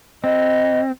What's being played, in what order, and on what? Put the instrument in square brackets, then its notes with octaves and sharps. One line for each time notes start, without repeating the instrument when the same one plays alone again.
[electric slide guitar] C4 [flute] D#5